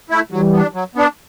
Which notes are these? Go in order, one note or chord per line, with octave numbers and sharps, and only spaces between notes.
A3 E4
E3 F#3 G3
B3 D4
F#3
B3 D4